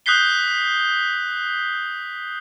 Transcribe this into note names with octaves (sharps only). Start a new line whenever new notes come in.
D#6 F#6 G6 B6 C7 G7